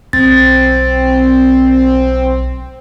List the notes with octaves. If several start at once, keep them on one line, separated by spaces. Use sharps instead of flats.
B1 C4 A6